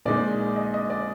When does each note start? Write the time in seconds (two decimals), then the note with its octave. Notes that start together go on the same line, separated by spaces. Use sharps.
0.05 A#1 A#2 G#3 D#4 D5
0.56 D#5
0.74 D#5
0.90 D5